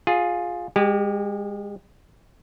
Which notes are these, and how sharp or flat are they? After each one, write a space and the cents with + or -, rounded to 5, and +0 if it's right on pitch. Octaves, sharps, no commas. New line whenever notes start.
F4 +15 G#4 +0
G#3 -30 G4 +0